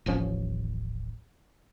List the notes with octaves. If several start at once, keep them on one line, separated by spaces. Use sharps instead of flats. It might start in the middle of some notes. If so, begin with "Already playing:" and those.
D#1 A1 F3 C#4